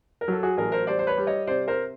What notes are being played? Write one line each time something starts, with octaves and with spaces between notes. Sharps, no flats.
A#4
F#3 A4
F#4 G#4
A1 G#4 A#4
A#4 C5
G3 C5 D5
C5
B4 C#5
G3
C#5 D#5
C3 C5 D5
A#4 C5